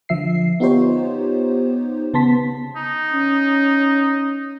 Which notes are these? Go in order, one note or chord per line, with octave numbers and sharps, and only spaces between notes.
D3 F3 E5 C7
B3 D#4 F4 G4 C5 C#5
C#3 B3 A5 C6 B6
D#4
C#4